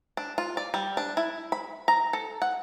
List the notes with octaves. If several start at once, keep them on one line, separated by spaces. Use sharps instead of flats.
D4
F4
D5
G3
D4
E4
B5
A#5
A4
F#5